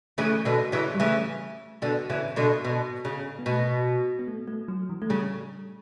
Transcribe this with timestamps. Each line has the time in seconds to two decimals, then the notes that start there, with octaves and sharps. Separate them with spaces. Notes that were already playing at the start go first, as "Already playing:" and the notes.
0.18 C#3 E3 A3
0.45 B2 D3
0.72 C#3 E3
0.94 G3
1.00 C#3 E3 A3
1.82 B2 D3 B3
2.10 C#3 E3
2.36 B2 D3
2.64 B2 B3
3.05 C#3
3.39 B3
3.46 B2 A3
4.19 B3
4.28 A3
4.48 A3
4.68 F#3
4.89 E3
5.02 A3
5.09 C#3 G3